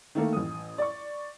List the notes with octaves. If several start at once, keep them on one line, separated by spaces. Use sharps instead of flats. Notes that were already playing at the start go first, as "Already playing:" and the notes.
D#3 A3 A#3
A1 D#6
D5 C#6